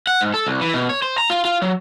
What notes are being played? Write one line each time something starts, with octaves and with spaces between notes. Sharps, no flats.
F#5
G#2
A4
C2
E3
B2
C#5
C5
A#5
F4
F4
F#3